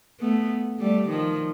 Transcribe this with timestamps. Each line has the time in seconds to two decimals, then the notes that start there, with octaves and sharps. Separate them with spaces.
0.20 A3 B3
0.79 G3 A3
1.09 D#3 F3